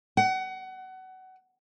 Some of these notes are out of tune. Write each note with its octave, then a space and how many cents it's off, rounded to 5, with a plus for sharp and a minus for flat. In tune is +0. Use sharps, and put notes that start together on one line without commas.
F#5 +25